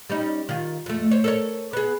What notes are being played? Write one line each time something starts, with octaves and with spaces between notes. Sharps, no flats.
G3 C#4 D#4
D#3 F4
F2 A3
C5 C#5
A4 A#4 C#5
B3 G#4